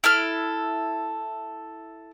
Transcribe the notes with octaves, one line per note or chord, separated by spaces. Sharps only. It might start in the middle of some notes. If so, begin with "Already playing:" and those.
E4 A4 F6